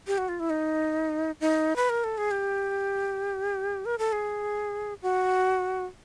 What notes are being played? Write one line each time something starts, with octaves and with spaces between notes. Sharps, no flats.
G4
F#4
F4
E4
D#4
D#4
B4
A#4
A4
G#4
G4
A#4
A4
G#4
F#4